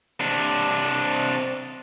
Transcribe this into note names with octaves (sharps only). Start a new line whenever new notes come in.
C3 D4